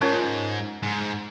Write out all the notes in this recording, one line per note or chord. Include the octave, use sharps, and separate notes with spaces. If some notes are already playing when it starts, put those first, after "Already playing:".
G#2 C#4 F4 A#4 C#5
G#2